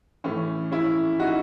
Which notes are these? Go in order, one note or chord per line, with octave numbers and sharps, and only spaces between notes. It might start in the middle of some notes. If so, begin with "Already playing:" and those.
A2 E3 A3 C#4
C#4 E4
D#4 F#4